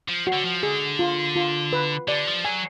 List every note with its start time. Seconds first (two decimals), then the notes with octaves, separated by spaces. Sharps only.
0.08 F3
0.27 F#4
0.33 D3
0.45 F3
0.63 D3 G#4
0.99 F4
1.36 F4
1.73 B4
2.08 D3 D5
2.27 F3
2.45 F#3 G#5